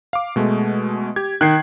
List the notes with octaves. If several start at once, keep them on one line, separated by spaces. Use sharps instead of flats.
F5 D6
B2 G#3 A3
G4 G#6
D#3 F#6 G#6 C7